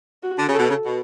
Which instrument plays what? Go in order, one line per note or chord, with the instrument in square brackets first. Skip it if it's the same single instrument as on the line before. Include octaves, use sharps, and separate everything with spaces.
[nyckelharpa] F#4
[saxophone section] D3
C#3
[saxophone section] B2 [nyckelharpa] A4
[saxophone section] C#3
B2